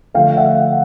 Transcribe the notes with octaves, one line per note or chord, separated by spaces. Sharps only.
D3 F3 A3 F5 G5
E5 F#5